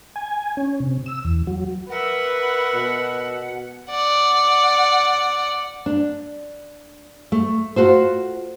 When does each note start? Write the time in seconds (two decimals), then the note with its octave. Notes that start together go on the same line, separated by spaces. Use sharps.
0.16 G#5
0.57 C#4
0.80 C3
1.06 E6
1.25 E2
1.47 F#3
1.89 A#4 B4 E5 F#5
2.74 B2
3.90 D5 F#5
5.86 D4
7.32 A3
7.76 F4 F#4 A4 C5